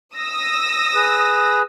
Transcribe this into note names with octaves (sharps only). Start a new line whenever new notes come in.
D#6 E6 A#6
G#4 B4